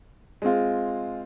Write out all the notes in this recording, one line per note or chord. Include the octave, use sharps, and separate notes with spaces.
G#3 C4 F4